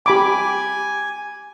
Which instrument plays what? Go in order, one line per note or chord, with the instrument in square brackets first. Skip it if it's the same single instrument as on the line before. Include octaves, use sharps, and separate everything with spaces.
[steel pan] G4 B5 D6 [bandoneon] G#5